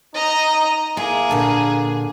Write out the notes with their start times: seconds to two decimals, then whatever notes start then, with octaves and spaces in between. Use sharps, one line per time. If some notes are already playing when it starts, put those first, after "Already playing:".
0.14 D#4 D#5 A#5
0.97 A#3 E4 G#4
1.29 A#2 D3 A5